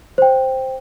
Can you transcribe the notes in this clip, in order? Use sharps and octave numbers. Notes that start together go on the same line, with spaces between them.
C5 G5